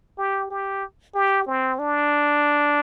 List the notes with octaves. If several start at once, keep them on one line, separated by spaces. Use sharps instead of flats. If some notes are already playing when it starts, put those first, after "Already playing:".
G4
G4
G4
C4
D4